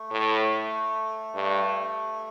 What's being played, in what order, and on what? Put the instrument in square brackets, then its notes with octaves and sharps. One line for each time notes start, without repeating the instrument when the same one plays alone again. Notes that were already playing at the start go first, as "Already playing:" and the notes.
Already playing: [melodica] A3
[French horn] A2
G2